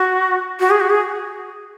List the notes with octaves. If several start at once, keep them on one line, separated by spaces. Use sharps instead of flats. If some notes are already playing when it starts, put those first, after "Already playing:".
Already playing: F#4
F#4
G#4
F#4
G#4